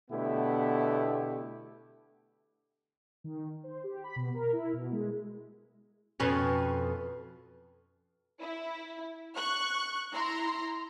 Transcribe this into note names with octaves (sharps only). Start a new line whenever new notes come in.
B2 D3 A3 B3 E4 G4
D#3
C5
G4
B5
B2
A#4
E4
B2
G#3
F2 B2 C#4
E4
C#6 F#6
E4 A#5 C6